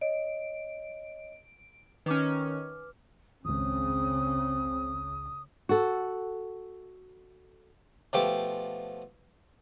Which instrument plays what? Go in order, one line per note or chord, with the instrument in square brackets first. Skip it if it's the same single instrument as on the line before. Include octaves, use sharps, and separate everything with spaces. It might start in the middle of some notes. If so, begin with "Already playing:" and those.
[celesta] C#5 D#5 [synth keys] D7
[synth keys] D#3 C#4 [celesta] B4 D6 F6
[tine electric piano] G#1 C#2 [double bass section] C#3 [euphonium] C4 [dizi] D#6
[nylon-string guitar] F#4 A4
[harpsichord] B2 F3 A3 G4 D6